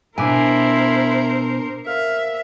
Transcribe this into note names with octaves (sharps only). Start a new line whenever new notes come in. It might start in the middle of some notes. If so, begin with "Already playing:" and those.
B2 D4 E4 A#4 C5 G#5 D6 D7
A#4 C5 E5 F5